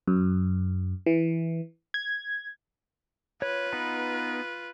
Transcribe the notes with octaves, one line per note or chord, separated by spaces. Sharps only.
F#2
E3
G#6
F4 B4 C#5
B3 D#4 B5